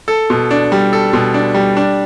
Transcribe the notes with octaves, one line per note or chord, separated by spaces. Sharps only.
A4
B2
D4
G3
A4
B2
D4
G3
D4